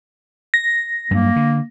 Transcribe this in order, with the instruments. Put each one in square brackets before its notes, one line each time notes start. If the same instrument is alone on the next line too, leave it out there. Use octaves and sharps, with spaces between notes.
[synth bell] A#6
[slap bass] G2 F#3 [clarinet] A#3
[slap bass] D3